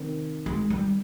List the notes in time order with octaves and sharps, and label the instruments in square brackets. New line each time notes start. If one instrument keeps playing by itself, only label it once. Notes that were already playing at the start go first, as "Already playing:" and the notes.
Already playing: [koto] C3 D#3
[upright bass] G#3
G3